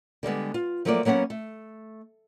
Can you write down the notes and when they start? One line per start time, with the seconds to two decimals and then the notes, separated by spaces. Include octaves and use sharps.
0.23 D3 G3 G#3 B3
0.54 F4
0.85 F3 F#3 A3 A#3 F4 D5
1.05 F#3 A#3 B3 C#4 F#5
1.30 A3